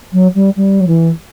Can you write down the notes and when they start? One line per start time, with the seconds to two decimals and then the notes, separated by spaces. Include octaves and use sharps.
0.12 F#3
0.34 G3
0.56 G3
0.80 F#3
0.87 E3